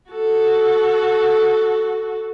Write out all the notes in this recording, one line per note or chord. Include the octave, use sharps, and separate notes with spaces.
F#4 A4